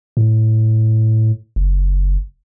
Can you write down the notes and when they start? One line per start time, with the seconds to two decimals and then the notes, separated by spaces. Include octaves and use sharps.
0.17 A2
1.56 F#1